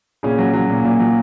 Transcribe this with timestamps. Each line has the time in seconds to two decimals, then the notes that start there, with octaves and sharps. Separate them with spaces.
0.23 A#2 C#3 C#4
0.38 F#3
0.53 F#3
0.70 A#2
0.85 A#2
0.99 F#3